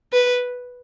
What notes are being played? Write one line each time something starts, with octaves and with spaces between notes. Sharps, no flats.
B4